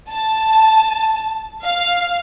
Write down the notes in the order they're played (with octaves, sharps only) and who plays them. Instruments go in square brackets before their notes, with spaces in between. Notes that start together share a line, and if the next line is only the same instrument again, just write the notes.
[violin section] A5
F5